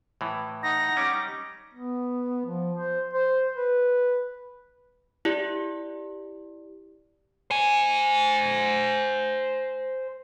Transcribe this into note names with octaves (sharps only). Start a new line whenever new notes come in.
A2 E3
D#4 F#5 A#6
G3 C#4 D6
B3
F3
C5
C5
B4
E4 G4 D5
C5 G#5